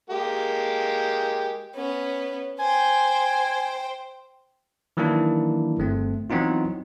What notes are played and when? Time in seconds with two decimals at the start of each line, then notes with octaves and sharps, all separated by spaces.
0.10 G#3 A#3 G4
1.75 B3 C#4
2.59 C5 G5 G#5
4.97 D#3 E3 F#3 A#3 D4 E4
5.78 G1 A3 C4
6.30 E3 F#3 B3 C4 D#4 F4